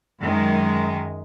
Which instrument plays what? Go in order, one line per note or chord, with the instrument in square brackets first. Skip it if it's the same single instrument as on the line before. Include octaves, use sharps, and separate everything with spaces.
[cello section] F#2 D#3 G#3